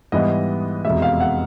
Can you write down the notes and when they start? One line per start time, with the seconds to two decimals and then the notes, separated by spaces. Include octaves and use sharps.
0.12 G#2 E3 G3 B3 D#5
0.85 F1 E2 B2 G#3 E5
1.02 F5
1.20 F#5